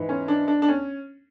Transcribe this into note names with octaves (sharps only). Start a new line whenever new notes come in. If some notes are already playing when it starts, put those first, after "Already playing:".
Already playing: G#2 E3
C#4
D4
D4
D4
C#4